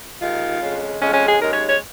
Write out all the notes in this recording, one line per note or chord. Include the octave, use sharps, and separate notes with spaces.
D#2 D#3 G#3 F4
F2 C#3 G#3
F2 C#3 G#3 C#4
C#4
G#4
D#2 C#3 G#3 A#4
C#5
C#5